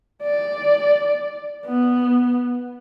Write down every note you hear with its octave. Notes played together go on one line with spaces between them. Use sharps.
D5
B3